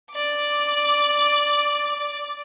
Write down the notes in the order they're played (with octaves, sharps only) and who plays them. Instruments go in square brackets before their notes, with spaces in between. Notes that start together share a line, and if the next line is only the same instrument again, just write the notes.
[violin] D5 D6